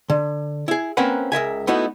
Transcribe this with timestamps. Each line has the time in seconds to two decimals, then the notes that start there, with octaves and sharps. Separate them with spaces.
0.10 D3
0.68 E4 G#4
0.97 A#3 C4 C#4 A#4 B4 F#5
1.32 C#2 A#4 E5 G#5
1.67 A3 B3 D#4 E4 F#4